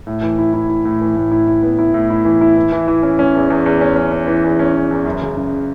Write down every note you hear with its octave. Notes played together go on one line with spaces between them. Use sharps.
A2
E3
E4
E4
E4
A2
E3
A2
E4
E4
B3
E4
A2
E4
E3
E4
E3
E3
E3
C#4
C#4
E2
E2
E2
C#4
C#4
C#4
E3
E2
C#4
E2
E2
F#2
C#3
F#2